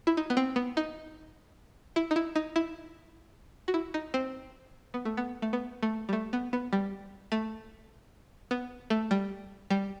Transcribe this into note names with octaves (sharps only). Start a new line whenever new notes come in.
E4
D#4
B3
C4
B3
D#4
E4
D#4
E4
D#4
E4
F#4
E4
D#4
C4
B3
A3
B3
A3
B3
A3
G3
A3
B3
B3
G3
A3
B3
A3
G3
G3